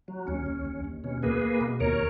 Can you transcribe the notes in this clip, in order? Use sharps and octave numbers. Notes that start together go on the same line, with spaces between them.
F#3
D#2 C#4
D#2
D#2
D#2
B2 C#4
A#3 G#4 B4
A#3
B2
D#2 A#4 C#5